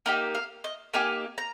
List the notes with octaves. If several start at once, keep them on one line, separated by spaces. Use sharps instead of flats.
A#3 D#4 G4 D#5
F5
D#5
A#3 D#4 G4 G#5
A#5